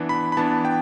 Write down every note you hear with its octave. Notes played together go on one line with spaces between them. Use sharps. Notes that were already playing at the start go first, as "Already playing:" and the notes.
Already playing: E3 B3 D4
B5
B5
E3 B3 D4 A5
G5